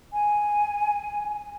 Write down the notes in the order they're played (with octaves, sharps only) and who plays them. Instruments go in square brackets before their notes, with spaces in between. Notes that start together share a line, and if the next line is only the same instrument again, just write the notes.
[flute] G#5